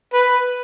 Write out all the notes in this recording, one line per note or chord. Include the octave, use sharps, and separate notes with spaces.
B4